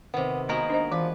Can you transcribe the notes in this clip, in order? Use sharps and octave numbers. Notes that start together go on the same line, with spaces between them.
C3 D#3 B3
G#3 A#3 B3 D#4 F#4 A#4
D4 C5 D#5
E3 F3 B4